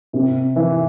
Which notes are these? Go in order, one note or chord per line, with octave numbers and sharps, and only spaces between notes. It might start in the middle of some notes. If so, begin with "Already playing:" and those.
C3
E3